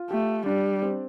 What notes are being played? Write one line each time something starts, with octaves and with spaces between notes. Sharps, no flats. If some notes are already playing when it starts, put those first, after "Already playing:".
Already playing: F4
A3 G4
G3 D4
C4